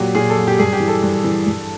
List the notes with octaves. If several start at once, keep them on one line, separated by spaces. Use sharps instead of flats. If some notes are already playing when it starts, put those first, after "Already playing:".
Already playing: A#2 F#3 G4
A#2 G#4
A4
F#3
G4
G2 G#4
G4
E3
A4
G2
E3
G2